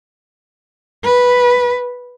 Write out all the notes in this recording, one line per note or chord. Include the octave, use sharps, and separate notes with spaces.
B4